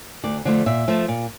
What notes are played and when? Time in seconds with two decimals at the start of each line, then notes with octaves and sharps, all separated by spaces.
0.24 D2 D5
0.45 D3 F3 A3
0.66 A#2 E5
0.88 F3 A3
1.08 A#2